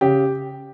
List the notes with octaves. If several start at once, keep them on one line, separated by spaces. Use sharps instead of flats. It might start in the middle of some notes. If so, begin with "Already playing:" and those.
C#3 G4